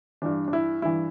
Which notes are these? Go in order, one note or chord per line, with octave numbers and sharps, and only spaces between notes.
G2 E3 D4
D4
E4
G2 E3 E4